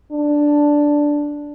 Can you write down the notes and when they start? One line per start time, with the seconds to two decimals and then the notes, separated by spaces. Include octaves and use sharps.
0.12 D4